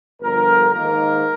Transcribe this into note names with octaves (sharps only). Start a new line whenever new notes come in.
G1 G2 D3 F3 A#4
G#2 D#3 A#3 A#4